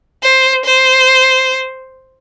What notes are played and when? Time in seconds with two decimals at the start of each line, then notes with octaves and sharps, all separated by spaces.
0.23 C5
0.65 C5